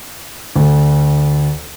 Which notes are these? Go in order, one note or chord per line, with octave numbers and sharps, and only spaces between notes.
D2